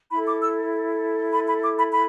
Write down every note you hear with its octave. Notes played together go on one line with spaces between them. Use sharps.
E4 A4 B5
D6
E6
B5
B5
D6
B5
B5